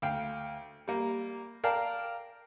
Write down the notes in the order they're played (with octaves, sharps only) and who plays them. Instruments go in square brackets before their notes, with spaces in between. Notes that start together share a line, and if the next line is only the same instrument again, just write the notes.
[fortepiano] D2 F5 G5
G3 A#3
A#4 D5 F5 G5 A5 D6